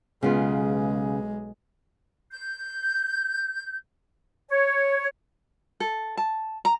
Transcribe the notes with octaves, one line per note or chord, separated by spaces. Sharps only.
B1 C#3 G#3 B3 F4
G6
C#5
A4
A5
A#5